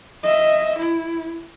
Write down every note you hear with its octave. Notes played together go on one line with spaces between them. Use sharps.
D#5 E5
E4